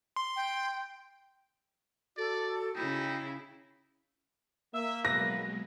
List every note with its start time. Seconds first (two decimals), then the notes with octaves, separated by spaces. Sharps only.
0.16 C6
0.36 G5
2.17 F#4 A4 D5
2.75 C#3 D#4 E4 G5
4.74 A#3 E5
5.05 B2 E3 F#3 G#3 B4 A#6